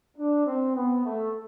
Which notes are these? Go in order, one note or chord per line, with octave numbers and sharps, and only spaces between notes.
D4
C4
B3
A3